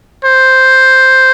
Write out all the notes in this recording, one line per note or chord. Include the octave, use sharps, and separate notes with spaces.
C5